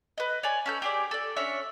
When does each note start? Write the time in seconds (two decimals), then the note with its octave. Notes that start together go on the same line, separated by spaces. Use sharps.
0.18 B4 D#5
0.43 C#5 D5 G#5
0.66 C#4 A4 G6
0.82 G4 G#4 D5
1.11 A4 D5
1.36 C#4 D4 C#5 E5